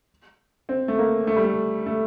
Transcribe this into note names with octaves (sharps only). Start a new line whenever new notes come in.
C4
A3
A#3
A3
G3
A3
A3